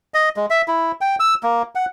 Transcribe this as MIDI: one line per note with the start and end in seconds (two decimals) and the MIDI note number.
0.14 0.29 75
0.37 0.46 56
0.50 0.62 76
0.68 0.92 64
1.01 1.16 79
1.20 1.35 88
1.43 1.62 58
1.75 1.86 78